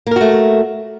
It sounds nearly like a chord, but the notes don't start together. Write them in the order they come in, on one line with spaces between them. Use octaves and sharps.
A#3 A#4 F#4 A3